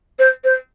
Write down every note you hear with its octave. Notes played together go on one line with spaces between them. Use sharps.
C5
C5